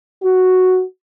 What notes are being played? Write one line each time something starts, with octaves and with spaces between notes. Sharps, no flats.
F#4